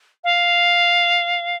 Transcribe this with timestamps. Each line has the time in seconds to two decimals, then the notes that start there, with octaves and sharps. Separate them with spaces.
0.24 F5